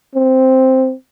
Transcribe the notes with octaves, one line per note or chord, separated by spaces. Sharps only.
C4